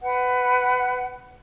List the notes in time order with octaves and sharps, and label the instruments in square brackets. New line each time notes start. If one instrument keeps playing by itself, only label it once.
[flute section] B4 F#5